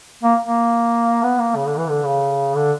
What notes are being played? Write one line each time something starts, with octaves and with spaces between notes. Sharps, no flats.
A#3
A#3
B3
A#3
C#3
D3
E3
D3
C#3
D3